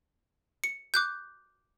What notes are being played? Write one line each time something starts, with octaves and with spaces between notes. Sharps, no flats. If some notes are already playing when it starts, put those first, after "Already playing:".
C#7
D6 F#6 G6